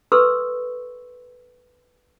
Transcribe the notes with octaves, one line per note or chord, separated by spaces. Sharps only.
A4 B4 C6 C#6 E6